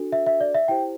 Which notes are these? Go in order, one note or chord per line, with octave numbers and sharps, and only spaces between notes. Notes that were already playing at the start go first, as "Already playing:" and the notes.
Already playing: D4 F#4 A4
E5
E5
D5
E5
E4 G4 C5 G5